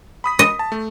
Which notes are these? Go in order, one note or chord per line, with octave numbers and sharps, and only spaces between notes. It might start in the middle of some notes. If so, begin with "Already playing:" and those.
B5 D#6 B6
D#5
A5
A3